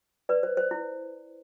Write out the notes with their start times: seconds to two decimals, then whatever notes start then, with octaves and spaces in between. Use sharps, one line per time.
0.29 B4 D5
0.43 C5
0.57 C5
0.71 E4